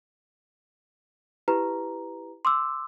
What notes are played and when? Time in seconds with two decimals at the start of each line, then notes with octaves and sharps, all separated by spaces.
1.48 E4 G4 B4 A#5
2.45 C6 D6 E6